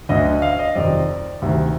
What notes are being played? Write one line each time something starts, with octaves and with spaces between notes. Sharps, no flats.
D2 D3 D#5
F5
D#5
F2 C3 D#3 D5
D2 C3 D#3